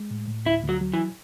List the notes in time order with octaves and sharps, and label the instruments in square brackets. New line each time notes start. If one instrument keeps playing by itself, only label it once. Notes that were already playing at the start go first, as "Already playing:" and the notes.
Already playing: [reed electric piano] G#3
A2
A2
[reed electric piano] D2 [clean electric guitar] E4
[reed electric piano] D2
[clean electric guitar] F#3
[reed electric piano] F#3
[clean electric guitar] E3